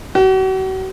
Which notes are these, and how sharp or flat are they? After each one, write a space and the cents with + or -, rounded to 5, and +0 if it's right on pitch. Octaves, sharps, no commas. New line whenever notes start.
F#4 +40